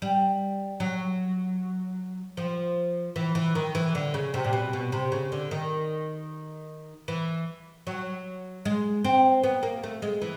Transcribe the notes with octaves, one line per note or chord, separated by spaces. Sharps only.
G3
F#3
F3
E3
E3
D#3
E3
D3
C#3
C3
A#2
B2
B2
C3
C#3
D3
D#3
E3
F#3
G#3
C4
B3
A#3
A3
G#3
E3